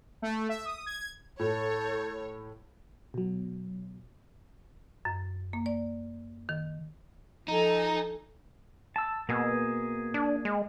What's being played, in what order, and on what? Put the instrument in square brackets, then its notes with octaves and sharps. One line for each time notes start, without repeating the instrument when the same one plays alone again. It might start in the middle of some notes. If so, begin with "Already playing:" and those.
[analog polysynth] A3
E5
D#6
G#6
[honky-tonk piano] A2 [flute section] A4 G6 G#6 [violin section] C#5
[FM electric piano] B2 F#3
[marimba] F#2
A#3
D5
D#3
[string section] F3 A4 G#5 [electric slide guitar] D#4 [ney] A#5
[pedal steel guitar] A5 E6
[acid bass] B2 [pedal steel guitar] A#3 G#4 E6
[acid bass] D4
G#3